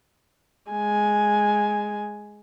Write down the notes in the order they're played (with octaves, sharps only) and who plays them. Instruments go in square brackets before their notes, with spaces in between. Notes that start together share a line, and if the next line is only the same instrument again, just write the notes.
[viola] G#3 G#5